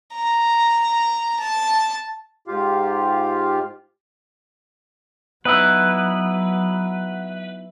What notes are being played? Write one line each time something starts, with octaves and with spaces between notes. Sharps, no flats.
A#5
A5
G#2 F4 G4 F5
F#3 B3 D#4 E4 B4